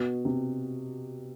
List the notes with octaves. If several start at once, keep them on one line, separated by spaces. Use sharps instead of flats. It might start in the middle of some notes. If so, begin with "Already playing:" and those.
Already playing: B2
C3